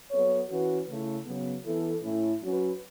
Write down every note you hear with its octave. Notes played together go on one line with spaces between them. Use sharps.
F#3 B3 A4 C#5
E3 C#4 F#4 B4
C#3 A3 E4
C#3 F#3 B3
E3 B3 E4 A4
A2 A3 C#4 E4
F#3 C#4 F#4 B4